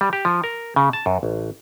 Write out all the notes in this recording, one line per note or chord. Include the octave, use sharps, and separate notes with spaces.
G3
G4
F3
A#4
C#3
A5
F#2
A1